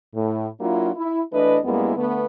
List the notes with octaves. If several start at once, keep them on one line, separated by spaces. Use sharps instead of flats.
A2
F#3 A#3 D4 E4 F4
E4
E3 A3 D4 E4 B4 D#5
F#2 G3 G#3 A#3 B3 E4
D3 A3 B3